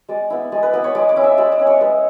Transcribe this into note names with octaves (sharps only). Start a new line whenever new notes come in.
G#3 D5
B3 E4
G#3 D5
B4
B3 E4 B4
C#5
G#3 D5
D5
C#4 E4
E5
G#3 D5
D5
C#4 E4
C#5
G#3 B4